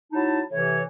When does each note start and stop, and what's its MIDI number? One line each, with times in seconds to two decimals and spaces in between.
0.13 0.41 54
0.13 0.41 63
0.13 0.41 64
0.13 0.41 81
0.51 0.83 45
0.51 0.83 48
0.51 0.83 52
0.51 0.83 73